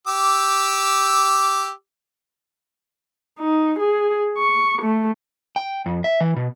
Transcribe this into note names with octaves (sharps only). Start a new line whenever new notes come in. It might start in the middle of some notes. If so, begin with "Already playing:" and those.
G4 D6 E6
D#4
G#4
C#6
A3
G5
F2
E5
E3
B2